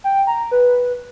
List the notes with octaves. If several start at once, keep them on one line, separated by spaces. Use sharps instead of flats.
G5
A#5
B4